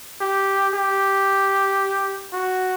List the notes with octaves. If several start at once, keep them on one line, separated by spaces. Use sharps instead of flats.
G4
G4
F#4